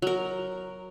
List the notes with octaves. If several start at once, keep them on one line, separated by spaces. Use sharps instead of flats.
F#3 A#4